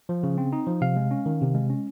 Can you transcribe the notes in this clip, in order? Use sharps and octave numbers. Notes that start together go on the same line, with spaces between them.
F3
C#3
C4
D#4
F3
C3 F5
G#3
C#4
D#3
C3
G#3
C#4